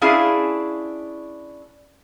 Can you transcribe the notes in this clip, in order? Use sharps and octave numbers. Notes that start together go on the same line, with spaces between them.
C#4 D4 E4 G#4 F5